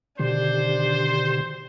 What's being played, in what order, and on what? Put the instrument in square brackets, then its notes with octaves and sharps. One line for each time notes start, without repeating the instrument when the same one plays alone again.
[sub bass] B2 [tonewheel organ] D3 D#3 G4 [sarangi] D4 [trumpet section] C5